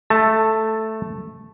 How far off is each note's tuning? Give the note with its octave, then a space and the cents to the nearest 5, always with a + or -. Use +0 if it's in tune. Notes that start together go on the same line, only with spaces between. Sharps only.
A3 +0 A5 +15